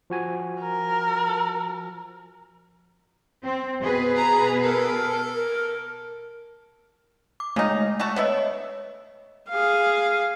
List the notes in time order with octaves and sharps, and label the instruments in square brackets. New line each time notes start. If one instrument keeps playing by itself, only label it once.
[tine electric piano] F3 F#4 G#5
[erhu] A#4
[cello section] C4
B2 G#4 B4
[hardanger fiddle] A#5
[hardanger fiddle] A4 [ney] A#4
[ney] A#4
[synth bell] D6
[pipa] C#3 D#4 [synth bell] G#3 A3
[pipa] A3 F#4 A5
[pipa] D3 B3 E5 [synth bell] C#5 D#5
[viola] G#4 F5